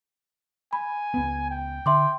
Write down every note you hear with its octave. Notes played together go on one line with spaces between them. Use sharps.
G#5 B5
C#2 B3
G5
D3 E5 C6 D6